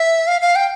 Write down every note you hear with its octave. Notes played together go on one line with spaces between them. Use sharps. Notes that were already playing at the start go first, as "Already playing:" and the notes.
Already playing: E5
F5
F5
G5